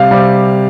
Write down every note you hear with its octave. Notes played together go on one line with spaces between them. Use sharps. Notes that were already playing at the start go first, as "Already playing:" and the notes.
Already playing: C3 G3 F5
C3 G3